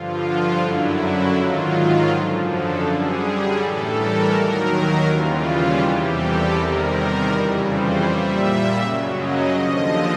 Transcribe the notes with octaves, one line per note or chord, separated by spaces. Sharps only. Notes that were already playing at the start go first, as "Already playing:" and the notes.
Already playing: G2 D3 F3 F4
F#2 D3 F#3 E4
E4
G#2 D#3 F#3 F4
F#2 D3 F3
A4
F#2 D3 G3 G#4
A2 E3 G3 A4
A#4
D#2 D#3 F#3
D#2 C#3 E3 G3 F4
E2 C3 E3 G3 G4
A4
E2 C3 D#3 G3 A#4
F2 C#3 E3 G3
C5
A#2 G3 E5
F#2 C#3 F#3
D#5
D#2 D3 F3 D#5